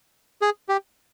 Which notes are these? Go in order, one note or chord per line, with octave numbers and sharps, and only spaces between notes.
G#4
G4